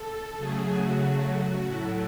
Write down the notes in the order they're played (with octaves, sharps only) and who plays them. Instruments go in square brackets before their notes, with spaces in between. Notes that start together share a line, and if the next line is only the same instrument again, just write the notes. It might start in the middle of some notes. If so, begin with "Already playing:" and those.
Already playing: [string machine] A4
C#3 F#3 A3 G#4
F#4
A2 F#3 A3 E4